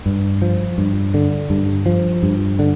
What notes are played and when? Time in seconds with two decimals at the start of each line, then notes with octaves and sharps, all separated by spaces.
0.06 G2
0.42 F3
0.78 G2
1.14 D3
1.50 G2
1.86 F3
2.23 G2
2.59 D3